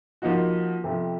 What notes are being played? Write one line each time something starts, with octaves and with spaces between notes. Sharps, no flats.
F3 A#3 D#4 F#4
F2 C3 F3